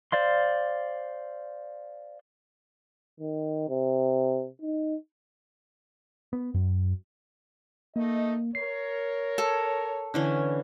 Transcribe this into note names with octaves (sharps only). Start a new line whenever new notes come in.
C5 D5 F5 C6
D#3
C3
D#4
B3
F#2
A3 A#3 D#4 D#5
A#4 C#5 C7
A4
D3 E3 C#4